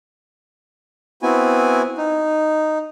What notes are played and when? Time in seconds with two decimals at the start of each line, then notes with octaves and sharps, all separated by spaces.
1.22 B3 C4 E4 F#4 G#5
1.98 D#4